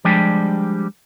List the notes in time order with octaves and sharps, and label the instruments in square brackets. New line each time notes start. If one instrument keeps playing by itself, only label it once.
[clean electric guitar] F3 G3 G#3 D4 G4